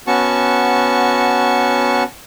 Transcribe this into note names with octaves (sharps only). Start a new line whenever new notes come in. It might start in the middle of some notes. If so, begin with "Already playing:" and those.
B3 C#4 F#4 A5 C#6